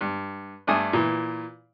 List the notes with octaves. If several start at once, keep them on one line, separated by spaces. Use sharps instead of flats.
G2
G2 A3 D4 G#5 D#6
A#2 E3